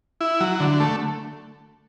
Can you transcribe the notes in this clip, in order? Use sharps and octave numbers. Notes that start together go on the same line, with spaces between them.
E4
F#3
D3
A3